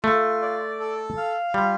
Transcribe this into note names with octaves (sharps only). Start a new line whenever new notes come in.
A3 F4
D5
A4
F5
G3 F4